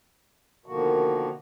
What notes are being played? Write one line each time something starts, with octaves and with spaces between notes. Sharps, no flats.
B2 D3 D#3 F3 A#3 F#4